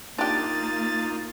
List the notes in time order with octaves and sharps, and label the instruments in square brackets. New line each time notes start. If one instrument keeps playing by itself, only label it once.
[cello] A#3 [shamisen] D4 G4 [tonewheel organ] D#4 F4 [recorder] A6